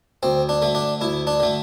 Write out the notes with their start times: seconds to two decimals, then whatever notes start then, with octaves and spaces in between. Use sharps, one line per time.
0.23 D2 C4
0.49 D4
0.62 D3 A3
0.75 D4
1.01 D2 E4
1.27 D4
1.40 D3 A3